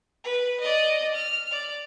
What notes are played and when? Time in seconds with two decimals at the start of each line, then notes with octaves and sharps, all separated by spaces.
0.24 B4
0.60 D5 D#5
1.14 F6
1.51 D5